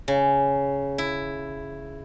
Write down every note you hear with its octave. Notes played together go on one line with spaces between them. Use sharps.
C#3
E4